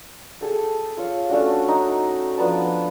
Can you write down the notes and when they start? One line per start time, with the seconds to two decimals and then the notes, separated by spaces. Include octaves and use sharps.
0.41 G#4 A4 G5
0.97 F4 C#5
1.29 A3 C#4 D4 F#4
1.68 D#4
2.37 F3 B3 D4 A5